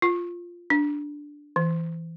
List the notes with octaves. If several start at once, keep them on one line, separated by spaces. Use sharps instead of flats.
F4
D4
E3